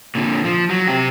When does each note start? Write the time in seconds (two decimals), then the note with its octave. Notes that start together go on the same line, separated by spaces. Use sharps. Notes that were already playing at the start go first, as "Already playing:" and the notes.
0.15 A#2 D3
0.45 F3
0.70 F#3
0.88 C3 G4